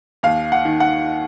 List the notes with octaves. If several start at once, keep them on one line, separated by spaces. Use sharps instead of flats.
D#2 F5
F#5
D#3
F#5